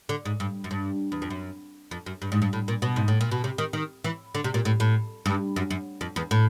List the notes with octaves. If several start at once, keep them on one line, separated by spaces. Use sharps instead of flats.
D3
G#2
G2
F#2
G2
E2
F2
F#2
F2
F#2
G2
G#2
G2
A2
A#2
B2
G#2
A2
A#2
B2
C3
D#3
D#3
E3
D3
C3
A#2
A2
A2
G2
F#2
F#2
F2
E2
A2